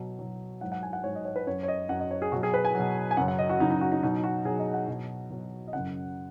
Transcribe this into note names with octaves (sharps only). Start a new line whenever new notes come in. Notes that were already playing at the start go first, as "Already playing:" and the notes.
Already playing: B2 F#3
B2 F#3
G#2 F#3 F#5
F#5
G#5
F#5
G#2 F#3 C#5
D#5
C#5
B4
F#2 F#3 C#5
C#5
D#5
F#2 F#3 F#5
D#5
C#5
G#4
B2 F#3 F#4
G#4
B4
G#5
B2 F#3
G#5
F#2 C#3 F#3 F#5
F#5
D#5
F#4
F#2 C#3 F#3 D#4
D#4
F#4
D#4
B2 F#3 D#4
F#4
B2 F#3 G#4
D#5
F#5
B2 F#3
B2 F#3
D#5
F#2 C#3 F#3 F#5